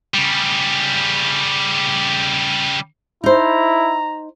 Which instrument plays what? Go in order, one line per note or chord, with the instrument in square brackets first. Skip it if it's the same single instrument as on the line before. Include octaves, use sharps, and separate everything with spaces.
[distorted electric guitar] C#3 G3
[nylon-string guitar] D#4 C5 [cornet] E4 [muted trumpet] A#5